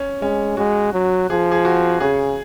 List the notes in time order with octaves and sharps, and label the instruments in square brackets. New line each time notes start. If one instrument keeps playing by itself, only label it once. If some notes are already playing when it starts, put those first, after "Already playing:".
Already playing: [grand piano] C#4
[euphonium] G#3 [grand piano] C#4
[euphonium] G#3 [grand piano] F#4
[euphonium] F#3
[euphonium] F3 [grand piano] G#4
[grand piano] G#4
F#4
[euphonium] C#3 [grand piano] G#4